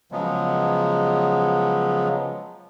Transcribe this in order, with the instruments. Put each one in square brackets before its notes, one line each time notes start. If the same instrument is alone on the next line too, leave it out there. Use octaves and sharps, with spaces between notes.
[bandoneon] C#3 F3 F#3 G#3 B3